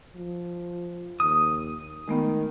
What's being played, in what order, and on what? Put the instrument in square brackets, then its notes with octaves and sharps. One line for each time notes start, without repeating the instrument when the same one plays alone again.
[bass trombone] F3
[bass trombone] D#2 [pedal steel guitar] D#6
[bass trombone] D#3 [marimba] G#3 A3 B3